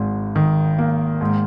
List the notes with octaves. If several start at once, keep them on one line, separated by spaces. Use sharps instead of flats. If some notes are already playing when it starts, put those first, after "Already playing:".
Already playing: G#1 G#2
D#3
A#3
G#2